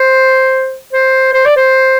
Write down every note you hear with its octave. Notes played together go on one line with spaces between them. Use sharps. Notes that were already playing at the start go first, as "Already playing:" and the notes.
Already playing: C5
C5
C5
D5
C5